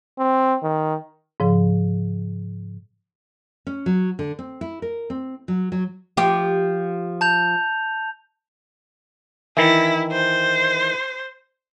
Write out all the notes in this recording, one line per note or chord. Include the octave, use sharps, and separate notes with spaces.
C4
D#3
G#2 C#3 F3
C#4
F#3
D3
C4
E4
A#4
C4
F#3
F#3
F3 G4
A5 G6 F7
D#3 E3 E4
C5